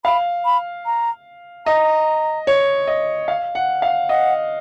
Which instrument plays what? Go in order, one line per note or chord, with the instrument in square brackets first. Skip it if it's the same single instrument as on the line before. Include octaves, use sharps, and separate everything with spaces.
[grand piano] F5 [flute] B5
[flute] B5
A#5
[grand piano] D#5 [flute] A#5
[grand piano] C#5
D#5
F5
F#5
F5
[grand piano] D#5 [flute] F#5